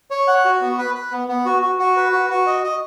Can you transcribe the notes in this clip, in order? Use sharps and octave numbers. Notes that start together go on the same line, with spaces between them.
C#5
F#5
F#4
B3
B4
B4
B3
B3
F#4
F#4
F#4
B4
F#4
F#4
D#5
D#5